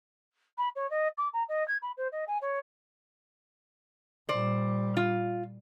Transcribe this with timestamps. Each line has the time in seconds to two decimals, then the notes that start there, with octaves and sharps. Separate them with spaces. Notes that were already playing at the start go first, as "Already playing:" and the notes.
0.58 B5
0.76 C#5
0.90 D#5
1.18 D6
1.33 A#5
1.49 D#5
1.68 G#6
1.82 B5
1.97 C5
2.12 D#5
2.28 G#5
2.42 C#5
4.29 A#2 G3 C5 D5
4.97 F4